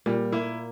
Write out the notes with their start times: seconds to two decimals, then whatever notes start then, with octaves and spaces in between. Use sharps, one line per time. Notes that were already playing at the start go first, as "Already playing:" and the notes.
0.06 A#2 G3
0.32 A#3 E4